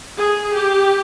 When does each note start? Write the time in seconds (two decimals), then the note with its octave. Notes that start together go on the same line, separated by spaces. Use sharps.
0.17 G#4
0.53 G4